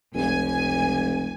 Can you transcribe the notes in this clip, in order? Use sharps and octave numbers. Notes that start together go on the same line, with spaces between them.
F1 C#2 G#5